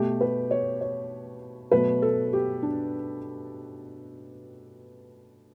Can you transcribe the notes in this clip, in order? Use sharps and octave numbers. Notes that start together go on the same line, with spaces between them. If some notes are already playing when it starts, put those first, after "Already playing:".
Already playing: B2 A3 G4
B4
C#5
C#5
B2 F#3 A3 B4
A4
G4
D4